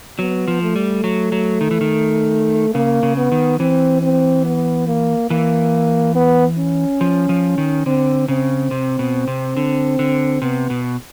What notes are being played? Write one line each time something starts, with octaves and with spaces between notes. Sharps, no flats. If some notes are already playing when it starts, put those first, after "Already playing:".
F#3 B3
F3
A3
G3
F#3
F#3
D#3
E3
D#3
C#3 A#3
C#3
B3
D#3
E3 C4
C4
B3
A#3
E3 A#3
B3
C#4
F3
F3
D#3
D3 C4
C#3 C4
C3
B2
C3
D3
D3
C3 B3
B2